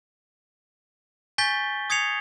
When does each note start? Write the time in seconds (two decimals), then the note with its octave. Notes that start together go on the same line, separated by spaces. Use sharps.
1.38 G#5 C#6 G6 A6 B6 G7
1.90 D#6 G#6 C7 C#7 F7